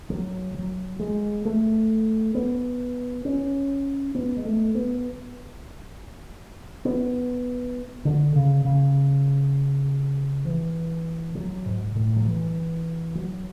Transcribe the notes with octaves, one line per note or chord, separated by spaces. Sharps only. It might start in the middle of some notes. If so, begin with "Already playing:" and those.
F#3
F#3
G#3
A3
B3
C#4
B3
G#3
A3
B3
B3
D3
C#3
C#3
E3
F#3
G#2
A2
F#3
E3
F#3